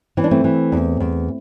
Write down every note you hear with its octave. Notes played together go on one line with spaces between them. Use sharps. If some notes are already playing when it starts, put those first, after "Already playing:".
E3 C4
D4
A3 C4
E3
E2
E2